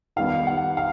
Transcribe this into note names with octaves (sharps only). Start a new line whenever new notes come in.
D#3 G3 B3 F5
F#5
F5